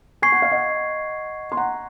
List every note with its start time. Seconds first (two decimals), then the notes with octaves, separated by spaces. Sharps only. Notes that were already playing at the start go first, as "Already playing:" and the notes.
0.22 G#5 C#6 G#6 C7
0.32 F#5
0.42 F5
0.52 D#5 F#5
1.52 C6
1.57 F#5 A#5